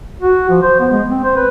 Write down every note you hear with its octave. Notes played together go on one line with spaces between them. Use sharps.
F#4
F3
C5
B3
G#3
C4
C5
B4